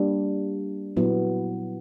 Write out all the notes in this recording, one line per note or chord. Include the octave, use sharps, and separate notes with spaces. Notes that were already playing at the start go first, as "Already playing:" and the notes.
Already playing: G3 A#3 D4
A#2 F#3 B3 E4